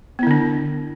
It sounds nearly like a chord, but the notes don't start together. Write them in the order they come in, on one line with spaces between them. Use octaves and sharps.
B3 E4 D3 D4